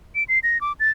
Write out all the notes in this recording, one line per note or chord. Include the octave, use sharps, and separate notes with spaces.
D7
C7
A#6
D6
A6